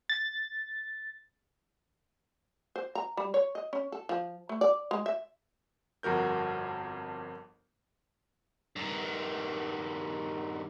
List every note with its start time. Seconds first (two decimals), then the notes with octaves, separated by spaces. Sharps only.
0.09 A6
2.76 C5
2.95 A#5
3.17 G3
3.34 C#5
3.55 D#5
3.73 C#4
3.92 A4
4.09 F3
4.49 A3
4.61 D5
4.91 G#3
5.06 E5
6.03 G1 F2 F#4 A#4 G6
8.76 G2 D#3